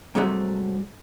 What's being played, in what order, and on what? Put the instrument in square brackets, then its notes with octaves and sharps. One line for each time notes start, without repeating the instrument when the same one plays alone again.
[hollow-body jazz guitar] G#2 C3 F#3 G3 A3